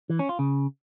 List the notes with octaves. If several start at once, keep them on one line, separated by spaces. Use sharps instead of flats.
E3
C#4
F4
C#3